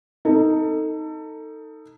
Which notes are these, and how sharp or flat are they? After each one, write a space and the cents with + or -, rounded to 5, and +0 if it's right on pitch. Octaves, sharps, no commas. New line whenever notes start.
D#4 +10 A4 +25